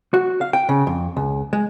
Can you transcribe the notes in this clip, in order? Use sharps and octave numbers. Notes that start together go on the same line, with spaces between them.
F#4
F5
G5
C#3
F2
C#2
G#3